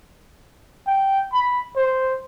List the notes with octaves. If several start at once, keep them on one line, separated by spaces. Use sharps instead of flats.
G5
B5
C5